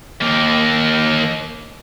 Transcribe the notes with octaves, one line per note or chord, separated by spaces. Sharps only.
D#2 A#3